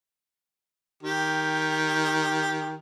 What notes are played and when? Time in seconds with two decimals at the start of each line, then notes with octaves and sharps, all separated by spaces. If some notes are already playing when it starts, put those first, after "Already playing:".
1.03 D#3 G4